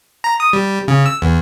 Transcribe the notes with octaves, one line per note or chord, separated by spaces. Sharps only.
A#5
D#6
G3
C#3
E6
E2